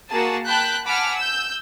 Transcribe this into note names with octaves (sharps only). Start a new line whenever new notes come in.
A#3 F#4 G#4 A5
G5 A5 B5 F#6 G6
F#5 G#5 A5 B5 D6 F6
E6 G6